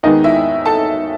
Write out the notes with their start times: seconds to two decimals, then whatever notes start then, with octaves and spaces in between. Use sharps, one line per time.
0.03 D#2 D#3 G#3 B3 D#4 D#5
0.24 E4 E5
0.66 A4 A5